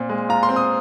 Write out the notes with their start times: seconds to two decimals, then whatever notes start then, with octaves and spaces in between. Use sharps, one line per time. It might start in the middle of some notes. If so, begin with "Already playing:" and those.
Already playing: A#2 C4
0.09 G#3
0.29 F4 A#5
0.43 C6
0.49 C4
0.56 D#6